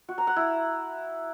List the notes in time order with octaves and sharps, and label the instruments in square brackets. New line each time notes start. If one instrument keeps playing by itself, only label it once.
[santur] F#4
A#5
F#5
E4